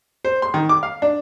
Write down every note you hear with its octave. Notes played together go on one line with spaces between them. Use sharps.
C5
C6
D#3
D6
F5
D4